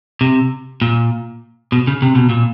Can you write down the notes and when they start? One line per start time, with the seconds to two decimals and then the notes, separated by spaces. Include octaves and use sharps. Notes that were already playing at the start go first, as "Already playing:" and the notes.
0.21 C3
0.82 A#2
1.72 B2
1.87 C#3
2.02 C3
2.15 B2
2.29 A#2